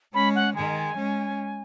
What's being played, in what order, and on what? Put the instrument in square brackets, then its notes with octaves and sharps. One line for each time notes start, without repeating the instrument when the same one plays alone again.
[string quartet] G#3 C#4 [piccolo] B5
[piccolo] F#5
[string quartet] D#3 G#3 [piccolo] G#5
[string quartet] G#3 C#4